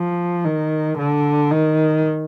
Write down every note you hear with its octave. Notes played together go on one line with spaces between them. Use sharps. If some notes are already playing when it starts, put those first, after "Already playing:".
Already playing: F3
D#3
D3
D#3